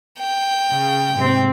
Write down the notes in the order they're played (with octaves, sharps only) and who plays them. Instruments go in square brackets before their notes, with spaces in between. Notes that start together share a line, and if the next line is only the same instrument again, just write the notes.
[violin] G5
[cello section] C#3
G#2 C3 C4